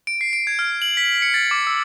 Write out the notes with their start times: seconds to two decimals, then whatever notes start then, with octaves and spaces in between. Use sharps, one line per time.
0.07 D7
0.21 C7
0.33 D7
0.47 G#6
0.59 F6
0.82 F#7
0.97 B6
1.22 C#7
1.34 A6
1.51 D6
1.67 E6